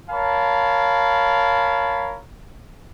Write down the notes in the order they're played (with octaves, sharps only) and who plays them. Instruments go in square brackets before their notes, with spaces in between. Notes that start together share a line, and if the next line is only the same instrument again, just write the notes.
[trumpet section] A#4 C#5 F5 A5 B5